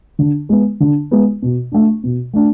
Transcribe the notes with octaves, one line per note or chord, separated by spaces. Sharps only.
D3
G#3 B3
D3
G#3 B3
B2
A3 D4
B2
A3 D4